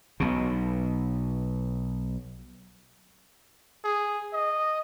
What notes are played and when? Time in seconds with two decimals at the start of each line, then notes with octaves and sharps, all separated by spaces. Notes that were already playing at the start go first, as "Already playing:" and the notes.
0.20 B1 B2
3.84 G#4
4.33 D#5